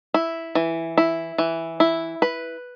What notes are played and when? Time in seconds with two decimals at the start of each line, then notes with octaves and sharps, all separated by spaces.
0.14 E4
0.55 E3
0.97 E4
1.38 E3
1.80 E4
2.22 B4